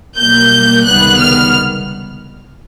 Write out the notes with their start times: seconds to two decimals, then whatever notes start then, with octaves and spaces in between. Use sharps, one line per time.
0.17 B1 B2 G3 A#3 G6
0.85 C#2 C3 D#3 G3 B3 F#6
1.19 F6